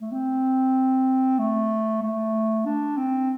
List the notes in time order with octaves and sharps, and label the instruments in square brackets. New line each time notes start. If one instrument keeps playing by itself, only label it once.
[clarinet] A3
C4
A3
A3
D4
C4